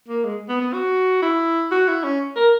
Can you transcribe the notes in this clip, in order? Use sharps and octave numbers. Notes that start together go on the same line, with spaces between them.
A#3
G#3
B3
B3
F#4
E4
F#4
E4
C#4
A#4